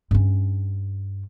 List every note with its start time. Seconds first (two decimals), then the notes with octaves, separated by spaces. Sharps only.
0.11 G2 C#4